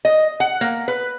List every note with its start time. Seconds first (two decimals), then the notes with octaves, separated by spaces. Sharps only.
0.05 D#5
0.40 F#5
0.61 A#3
0.88 B4